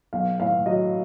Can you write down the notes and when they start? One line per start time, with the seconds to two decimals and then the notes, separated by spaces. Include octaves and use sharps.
0.13 B1 F5
0.40 A2 F5
0.66 F#3 D#5